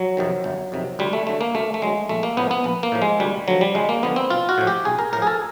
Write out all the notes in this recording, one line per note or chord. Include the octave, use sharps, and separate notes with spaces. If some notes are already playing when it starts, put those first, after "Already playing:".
Already playing: F#3
F2 C3 D#3
G1
F2 C3 D#3
D2 G3
A3
D3 F#3 A3
A#3
D2 A3
A3
D3 F#3 G#3
A#1 A3
A#3
A2 F3 B3
B3
A#1
A#3
A2 F3
G#3
D2 G3
D3 F3 F#3
G3
D2 G#3
A#3
D3 F3 B3
C4
B1 F4
F#4
A2 F3
G4
B1 G#4
A#4
A2 F3 A#4
G#4
A4